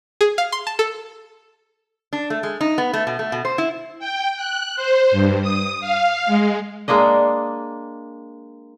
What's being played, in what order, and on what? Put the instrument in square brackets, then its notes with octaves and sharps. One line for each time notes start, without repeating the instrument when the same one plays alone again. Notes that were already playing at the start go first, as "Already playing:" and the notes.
[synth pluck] G#4
F5
C6
A5
A4
[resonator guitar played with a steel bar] D4
A3
G#3
D#4
B3
A3
B2
A3
B2
C5
E4
[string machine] G5
F#6
C5
G2
D#6
F5
G#3
[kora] G#3 A#3 D4 D#5